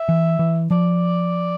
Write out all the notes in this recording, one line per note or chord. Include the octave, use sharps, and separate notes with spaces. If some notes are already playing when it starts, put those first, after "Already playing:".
Already playing: E5
E3
E3
F3 D5